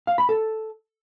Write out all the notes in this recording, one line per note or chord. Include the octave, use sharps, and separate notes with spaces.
F5
B5
A4